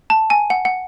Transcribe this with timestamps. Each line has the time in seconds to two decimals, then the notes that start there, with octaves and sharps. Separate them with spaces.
0.10 A5
0.30 G#5
0.50 F#5
0.65 F#5